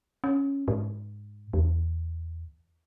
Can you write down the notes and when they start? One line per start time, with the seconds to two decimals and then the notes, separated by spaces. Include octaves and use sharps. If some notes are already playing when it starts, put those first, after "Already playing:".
0.24 C#4
0.68 G#2
1.53 E2